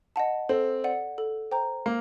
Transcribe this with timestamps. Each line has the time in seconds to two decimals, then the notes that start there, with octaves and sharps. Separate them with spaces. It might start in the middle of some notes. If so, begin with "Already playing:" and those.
0.16 D#5 F#5 A5
0.49 C4 A4
0.84 D5 F#5
1.18 A4
1.51 C5 G5 A#5
1.86 A#3